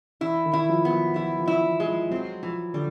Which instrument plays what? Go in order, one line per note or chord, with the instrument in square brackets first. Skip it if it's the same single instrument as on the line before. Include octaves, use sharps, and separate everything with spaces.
[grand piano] E3 [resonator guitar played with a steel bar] E4
[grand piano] D#3
[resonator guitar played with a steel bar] E4
[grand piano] F3
[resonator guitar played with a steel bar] B3
[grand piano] F#3
[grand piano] F3 [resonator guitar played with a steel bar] E4
[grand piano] F3
[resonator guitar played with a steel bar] E4
[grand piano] E3
[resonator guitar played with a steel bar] G#3
[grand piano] F3
[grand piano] F#3 [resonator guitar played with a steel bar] C4
[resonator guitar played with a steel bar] E3 [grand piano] F3
[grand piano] D3 [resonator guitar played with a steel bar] G3